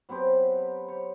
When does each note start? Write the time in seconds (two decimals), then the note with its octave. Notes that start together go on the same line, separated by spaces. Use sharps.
0.09 F#3 B3 C4 G4
0.88 C#5